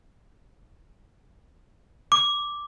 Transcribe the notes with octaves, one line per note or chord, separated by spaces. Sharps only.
D6